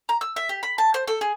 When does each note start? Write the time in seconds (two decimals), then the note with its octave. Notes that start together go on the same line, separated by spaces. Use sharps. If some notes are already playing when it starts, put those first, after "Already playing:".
0.09 A#5
0.21 E6
0.36 E5
0.49 G4
0.63 B5
0.78 A5
0.94 C5
1.08 A4
1.21 G#4